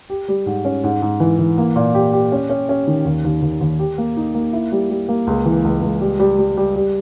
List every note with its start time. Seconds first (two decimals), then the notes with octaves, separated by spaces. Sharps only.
0.10 G4
0.28 G3
0.46 G#2
0.65 C#4
0.84 G#2
1.02 G#2
1.20 E3
1.39 E3
1.58 A#3
1.76 A#2
1.95 G4
2.13 G4
2.32 C#4
2.50 C#4
2.69 C#4
2.87 D#3
3.05 D#2
3.24 D#2
3.42 D#2
3.61 D#2
3.80 G4
3.98 A#3
4.17 D#4
4.34 A#3
4.53 E4
4.72 G3
4.90 G3
5.09 A#3
5.27 C#2
5.46 E3
5.64 C#2
5.82 C#2
6.01 G3
6.19 G3
6.39 G3
6.57 G3
6.75 G3